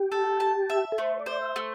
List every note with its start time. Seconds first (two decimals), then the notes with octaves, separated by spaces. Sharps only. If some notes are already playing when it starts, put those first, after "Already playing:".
Already playing: G4
0.12 A4
0.40 A5
0.70 E5
0.92 A4
0.98 A3 C5
1.19 D5
1.26 C5
1.41 E5
1.56 A3